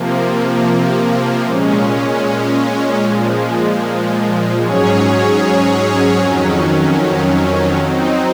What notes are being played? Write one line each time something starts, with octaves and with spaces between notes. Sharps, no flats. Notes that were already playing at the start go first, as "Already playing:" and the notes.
Already playing: C3 F3 A#3
A#2 G#3 C#4
A#2 F3 G#3
G#2 F#3 C#4 G#4 C#5
F2 D#3 F#3 C#4
F#3 C4 D#4